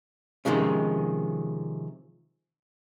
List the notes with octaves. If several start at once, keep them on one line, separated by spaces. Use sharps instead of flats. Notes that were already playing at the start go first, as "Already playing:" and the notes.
C3 D#3 F3 G#3 C#4